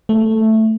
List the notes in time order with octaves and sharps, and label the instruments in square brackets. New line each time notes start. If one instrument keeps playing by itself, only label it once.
[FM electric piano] A3